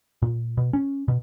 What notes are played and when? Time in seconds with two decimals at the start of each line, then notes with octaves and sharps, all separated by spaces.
0.22 A#2
0.57 B2
0.73 C#4
1.08 B2